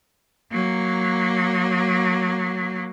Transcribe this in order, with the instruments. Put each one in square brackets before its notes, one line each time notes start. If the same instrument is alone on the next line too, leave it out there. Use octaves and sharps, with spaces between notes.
[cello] F#3 A#3